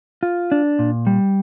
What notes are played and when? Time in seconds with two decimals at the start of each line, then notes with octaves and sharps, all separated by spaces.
0.23 F4
0.52 D4
0.79 A#2
1.07 G3